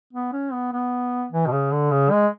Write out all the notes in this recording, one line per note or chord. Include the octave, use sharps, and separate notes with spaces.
B3
C#4
B3
B3
E3
B2
C#3
D3
C#3
G#3